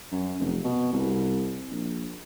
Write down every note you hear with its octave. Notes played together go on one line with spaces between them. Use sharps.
F#2
F1
B2
C2
A#1